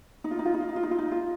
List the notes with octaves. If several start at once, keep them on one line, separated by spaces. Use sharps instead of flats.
D#4
F4
D#4
F4
D#4
F4
D#4
F4
D#4
F4
D#4
F4